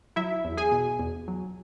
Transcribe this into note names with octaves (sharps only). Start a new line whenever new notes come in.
F#3 E4 E5
E2
G#4 G#5
B2
E2
F#3